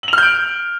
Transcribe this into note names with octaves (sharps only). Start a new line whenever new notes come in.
F6 G6 D7 F7 F#7